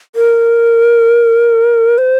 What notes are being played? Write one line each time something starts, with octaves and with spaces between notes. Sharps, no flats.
A#4
C5